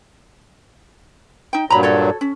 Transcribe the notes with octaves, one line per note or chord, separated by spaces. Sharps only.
D#4 G5
G2 A#2 F#3 A#5 B5
F#4 A4 C#5
C#4